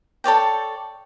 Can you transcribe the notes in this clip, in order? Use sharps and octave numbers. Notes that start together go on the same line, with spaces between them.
A4 C#5 D5 G5